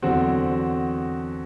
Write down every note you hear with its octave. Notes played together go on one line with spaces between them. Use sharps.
E2 D3 F#3 C4 F#4